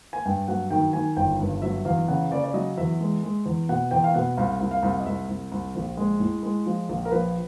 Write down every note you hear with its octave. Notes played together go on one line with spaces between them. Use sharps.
G#5
G2 G5
F#3 F#5
D#3 G5
D#3 G#5
G1 G5
G2
F#3 E5
E2 F5
C#3 F#5
C#3 D5
D5
F#3 D#5
E2 E5
G#3
G#3
E2
B2 F#5
E2 G5
F5
B2 F#5
C2 F5
C2
F5
C2
D#5
C2 E5
C2
C2
A#1
G#3
A2
G#3
F3
A#1
A#4
F3 B4